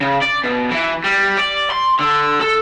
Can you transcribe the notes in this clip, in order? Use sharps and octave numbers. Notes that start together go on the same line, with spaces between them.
C#3
D5
B2
E3
G3
D5
C6
D3
A4